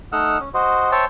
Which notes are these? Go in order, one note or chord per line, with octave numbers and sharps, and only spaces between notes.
A3 D#4 D#5 F#5 E6 F6
C#4
F#4 C5 D#5
C5 C#5 E5 G5 A5